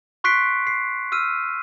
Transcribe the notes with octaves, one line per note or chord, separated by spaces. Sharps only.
C6 C#6 F#6 B6 C7 D7
C7
E6 F6 D#7